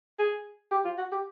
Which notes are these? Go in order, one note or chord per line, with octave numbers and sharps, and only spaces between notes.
G#4
G4
F4
F#4
G4